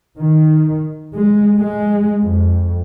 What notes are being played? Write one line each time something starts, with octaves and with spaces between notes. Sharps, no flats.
D#3
G#3
G#3
F2